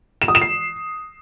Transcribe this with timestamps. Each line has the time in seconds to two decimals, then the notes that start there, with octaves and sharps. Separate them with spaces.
0.22 E7
0.28 D#6
0.35 E7
0.42 C7